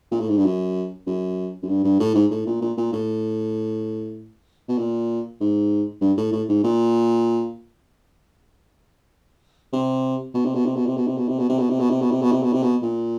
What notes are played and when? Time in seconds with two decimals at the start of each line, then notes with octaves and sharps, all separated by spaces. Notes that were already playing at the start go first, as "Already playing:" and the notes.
0.12 A#2
0.20 A2
0.29 G#2
0.37 G2
0.45 F#2
1.07 F#2
1.63 F#2
1.69 G2
1.84 G2
2.00 A2
2.15 G#2
2.31 A2
2.46 A#2
2.62 A#2
2.77 A#2
2.93 A2
4.68 B2
4.78 A#2
5.40 G#2
6.01 G2
6.17 A2
6.33 A2
6.49 G#2
6.64 A#2
9.73 C3
10.34 B2
10.45 C3
10.55 B2
10.66 C3
10.76 B2
10.87 C3
10.97 B2
11.07 C3
11.18 B2
11.29 C3
11.39 B2
11.49 C3
11.59 B2
11.70 C3
11.80 B2
11.90 C3
12.02 B2
12.11 C3
12.22 B2
12.32 C3
12.43 B2
12.53 C3
12.63 B2
12.82 A#2